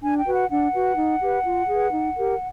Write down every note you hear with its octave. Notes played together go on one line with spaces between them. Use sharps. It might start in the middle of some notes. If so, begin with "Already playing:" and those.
D4 G#5
G5
F#4 B4
F#5
D4 F#5
F#4 B4
D#4
G4 B4
F4
G#4 B4
D#4
G4 A#4